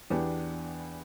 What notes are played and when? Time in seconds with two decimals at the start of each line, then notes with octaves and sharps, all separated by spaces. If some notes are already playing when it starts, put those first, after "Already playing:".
0.10 E2 E3 B3 D4 G4